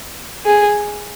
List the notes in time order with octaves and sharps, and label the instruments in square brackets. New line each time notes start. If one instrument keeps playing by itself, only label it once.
[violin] G#4